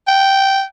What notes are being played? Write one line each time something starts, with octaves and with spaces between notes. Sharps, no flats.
G5